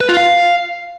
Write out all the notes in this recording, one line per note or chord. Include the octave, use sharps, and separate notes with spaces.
B4
F4
F5